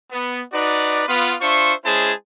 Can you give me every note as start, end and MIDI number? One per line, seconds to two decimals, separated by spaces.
0.11 0.41 59
0.53 1.02 63
0.53 1.02 66
0.53 1.02 71
0.53 1.02 74
1.08 1.33 59
1.08 1.33 65
1.08 1.33 71
1.41 1.73 62
1.41 1.73 65
1.41 1.73 72
1.41 1.73 76
1.41 1.73 85
1.85 2.11 56
1.85 2.11 61
1.85 2.11 64
1.85 2.11 68
1.85 2.11 72
1.85 2.11 81